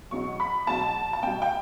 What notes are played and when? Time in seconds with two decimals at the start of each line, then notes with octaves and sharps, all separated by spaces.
0.11 E2 B2 F#3 C#6
0.40 B5
0.67 E2 B2 F#3 A5
1.13 A5
1.23 B2 G3 G5
1.42 G5